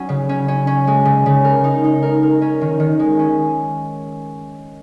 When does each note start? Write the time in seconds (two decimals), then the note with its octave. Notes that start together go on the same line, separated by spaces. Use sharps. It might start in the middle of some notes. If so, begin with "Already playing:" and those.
Already playing: F#3 C#4
0.09 C#3
0.29 C#4
0.48 C#4
0.67 C#4
0.87 G#3
1.05 C#3
1.26 C#3
1.44 A#4
1.64 D#4
1.84 D#4
2.02 A#4
2.23 A#4
2.42 C#4
2.61 D#3
2.80 D#3
3.00 G#3
3.19 C#4